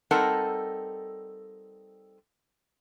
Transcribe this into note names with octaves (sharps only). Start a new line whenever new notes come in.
G3 C4 D#4 A4 A#4 F#5